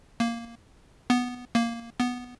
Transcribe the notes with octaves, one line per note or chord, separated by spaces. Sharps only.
A#3
B3
A#3
B3